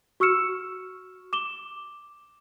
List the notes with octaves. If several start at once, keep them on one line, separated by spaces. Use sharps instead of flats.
F#4 C#6 E6 F6 C#7 E7
D6 E7 G7